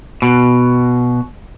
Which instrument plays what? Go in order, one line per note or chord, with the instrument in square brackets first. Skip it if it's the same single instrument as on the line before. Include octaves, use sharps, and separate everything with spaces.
[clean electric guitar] B2